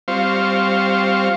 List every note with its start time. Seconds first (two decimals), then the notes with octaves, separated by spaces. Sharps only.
0.08 G3 C4 F4 C5 F5 C#6